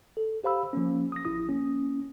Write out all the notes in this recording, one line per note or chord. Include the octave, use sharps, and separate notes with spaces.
A4
G4 C5 F5 B5 E6
F3 A#3 C#4
D#6 A#6
A1 F3 E4 D#6
A#3 C#4